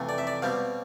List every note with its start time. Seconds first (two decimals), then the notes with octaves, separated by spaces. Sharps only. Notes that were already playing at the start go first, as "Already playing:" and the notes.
Already playing: F2 C3 E3 A3
0.09 D5
0.18 E5
0.27 D5
0.42 B2 G3 C4 F5